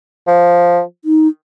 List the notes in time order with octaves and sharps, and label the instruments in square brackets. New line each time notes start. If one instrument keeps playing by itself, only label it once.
[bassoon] F3
[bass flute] D#4